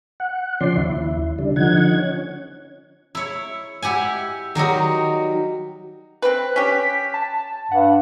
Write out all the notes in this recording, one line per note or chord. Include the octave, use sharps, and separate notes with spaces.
F#5
C#3 F3 C#4 D5 C6
D#2 E4
C#3 G3 D4
D3 F3 D#4 F#5 G#6
C#4
E4 C#5
E4 G4 F#5 G#5
D#3 F#3 G3 D#4
C4 B4 F#6
C#4 G4 B6
A5
G2 F#5